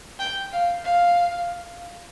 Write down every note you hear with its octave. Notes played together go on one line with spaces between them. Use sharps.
G5
F5
F5